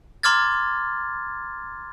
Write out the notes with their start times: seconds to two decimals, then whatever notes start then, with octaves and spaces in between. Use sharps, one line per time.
0.23 A#5 C6 D6 F6 G#6 A6